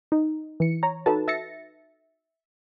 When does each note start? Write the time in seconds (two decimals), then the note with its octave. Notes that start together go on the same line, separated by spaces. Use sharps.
0.12 D#4
0.60 E3 C#7
0.83 C#5 A#5
1.06 D#4 F#4 A4 B4 A5
1.28 E5 A6 A#6 C#7